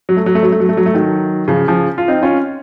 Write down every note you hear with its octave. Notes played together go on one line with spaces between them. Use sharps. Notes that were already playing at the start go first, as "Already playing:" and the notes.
F#3
A3
F#3
A3
F#3
A3
F#3
A3
F#3
A3
D#3 F#3
C#3 F3
C#3 F3
F4
C4 D#4
C#4 F4